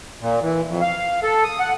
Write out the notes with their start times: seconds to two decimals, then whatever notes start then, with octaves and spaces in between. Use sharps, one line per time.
0.21 A#2
0.42 E3
0.68 F2
0.81 F5
1.23 A4
1.44 D#6
1.60 F#5